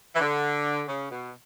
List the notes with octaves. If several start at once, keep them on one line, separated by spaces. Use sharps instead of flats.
E3
D3
C#3
B2